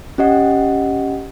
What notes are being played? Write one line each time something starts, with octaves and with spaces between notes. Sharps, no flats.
C#4 G4 D#5 F#5